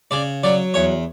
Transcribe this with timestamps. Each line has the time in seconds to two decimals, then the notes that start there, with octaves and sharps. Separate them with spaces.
0.11 C#3 D5
0.44 F#3 D5
0.74 E2 C#5